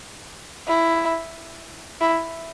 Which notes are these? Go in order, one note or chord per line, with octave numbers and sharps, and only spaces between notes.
E4
E4